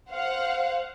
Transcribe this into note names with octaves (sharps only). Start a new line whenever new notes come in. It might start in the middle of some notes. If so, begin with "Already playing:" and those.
C5 F5 F#5